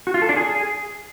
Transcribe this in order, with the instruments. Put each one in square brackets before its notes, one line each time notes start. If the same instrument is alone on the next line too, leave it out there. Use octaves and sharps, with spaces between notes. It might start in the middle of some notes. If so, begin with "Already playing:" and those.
[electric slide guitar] F#4
F4
A4
D4
G#4